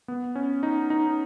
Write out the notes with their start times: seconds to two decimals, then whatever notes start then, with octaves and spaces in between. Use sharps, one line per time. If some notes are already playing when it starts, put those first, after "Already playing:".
0.08 B3
0.36 C#4
0.63 D#4
0.90 D#4